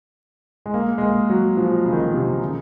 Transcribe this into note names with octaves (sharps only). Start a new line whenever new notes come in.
G#3
A#3
G#3
A#3
F#3
F3
C#3
D#3
C#3
C3
C#3